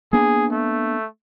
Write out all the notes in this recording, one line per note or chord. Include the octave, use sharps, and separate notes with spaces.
A#3 B3 D4 G#4
A3